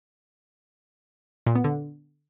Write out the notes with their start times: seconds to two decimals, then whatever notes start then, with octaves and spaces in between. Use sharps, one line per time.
1.46 A#2
1.55 B3
1.64 D3